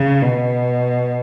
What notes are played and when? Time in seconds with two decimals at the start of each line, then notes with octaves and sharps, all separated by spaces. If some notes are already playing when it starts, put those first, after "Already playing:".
Already playing: C#3
0.22 B2